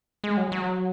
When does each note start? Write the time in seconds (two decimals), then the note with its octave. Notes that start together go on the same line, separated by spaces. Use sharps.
0.24 G#3
0.37 F#3
0.52 F#3